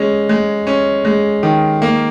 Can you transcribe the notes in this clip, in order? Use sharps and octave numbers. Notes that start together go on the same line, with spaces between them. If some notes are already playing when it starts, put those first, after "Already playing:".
Already playing: G#3 C#4
G#3
C#4
G#3
D#3
A#3